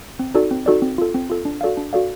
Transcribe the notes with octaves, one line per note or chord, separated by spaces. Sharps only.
C4
D#4 F#4 A4 D5
C4
D#4 F#4 A4 D5
C4
F4 A4
C4
F4 A4
D4
F#4 A4 D5 F5
D4
F#4 A4 D5 F5